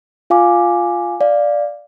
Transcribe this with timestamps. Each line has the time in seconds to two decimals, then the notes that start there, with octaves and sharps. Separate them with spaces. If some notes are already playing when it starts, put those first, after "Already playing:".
0.30 F4 F5 G#5 D6
1.21 D5 F5